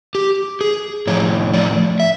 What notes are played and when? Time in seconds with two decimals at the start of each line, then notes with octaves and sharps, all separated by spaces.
0.15 G4
0.61 G#4
1.07 A2 F3 C#5
1.54 D5
2.00 E5